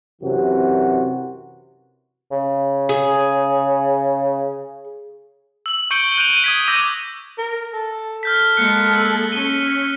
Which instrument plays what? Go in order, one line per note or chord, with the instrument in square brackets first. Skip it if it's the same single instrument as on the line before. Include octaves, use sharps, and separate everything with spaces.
[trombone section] F#2 C3 E3 F#4
[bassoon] C#3
[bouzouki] G#4
[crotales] E6 F#7
C#6 G6 C#7 D7 G7
F#6 G6 D7 D#7 F7 G7
D#6 G#6 B6
D6 E6 G6 A#6 D#7
[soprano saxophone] A#4
A4
[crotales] F6 G6 B6
[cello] G#3 A#3 [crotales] F#6 C#7
[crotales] E6 F6
[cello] C#4 [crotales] D#7 G7